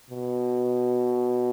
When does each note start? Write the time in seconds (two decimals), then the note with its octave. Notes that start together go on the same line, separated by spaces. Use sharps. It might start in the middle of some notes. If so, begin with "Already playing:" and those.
0.10 B2